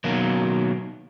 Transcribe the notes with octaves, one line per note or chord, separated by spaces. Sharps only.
B2 D#3 F#3 A#3